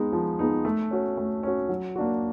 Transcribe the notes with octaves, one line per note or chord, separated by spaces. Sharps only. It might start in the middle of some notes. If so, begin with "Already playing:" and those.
Already playing: G#3 B3 D#4
F3
G#3 B3 D#4
A3
C#4 F#4
A3
C#4 F#4
F#3
A#3 D4 F#4